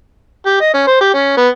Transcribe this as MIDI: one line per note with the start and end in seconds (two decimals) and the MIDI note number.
0.46 0.59 67
0.60 0.73 75
0.74 0.86 61
0.87 0.98 72
1.01 1.13 67
1.14 1.33 61
1.37 1.48 59